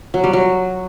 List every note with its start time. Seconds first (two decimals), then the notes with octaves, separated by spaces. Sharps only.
0.14 F#3
0.24 G3
0.33 F#3